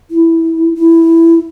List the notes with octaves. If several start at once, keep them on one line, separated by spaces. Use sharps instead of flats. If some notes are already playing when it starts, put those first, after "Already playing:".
E4
E4